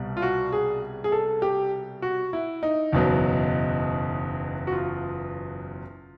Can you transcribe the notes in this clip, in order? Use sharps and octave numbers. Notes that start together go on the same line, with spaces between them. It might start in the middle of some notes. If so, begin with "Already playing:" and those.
Already playing: C2 B2 G3
F4
F#4
G#4
G#4
A4
G4
F#4
E4
D#4
F#1 E2 B2 F#3
F#4
F4